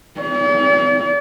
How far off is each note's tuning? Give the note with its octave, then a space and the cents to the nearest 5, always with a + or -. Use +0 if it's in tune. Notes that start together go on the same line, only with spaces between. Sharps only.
D5 -45